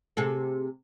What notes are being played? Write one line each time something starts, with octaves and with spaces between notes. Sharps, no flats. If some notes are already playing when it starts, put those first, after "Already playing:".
C3 G#4 A4